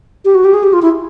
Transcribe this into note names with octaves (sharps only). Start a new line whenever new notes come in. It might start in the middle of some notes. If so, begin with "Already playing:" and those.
G4
F#4
G4
G#4
G4
F4
E4